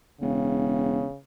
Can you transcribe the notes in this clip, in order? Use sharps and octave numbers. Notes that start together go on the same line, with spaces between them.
E1 C#3